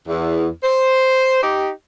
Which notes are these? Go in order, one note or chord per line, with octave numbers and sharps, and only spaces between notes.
E2
C5
D#4 G4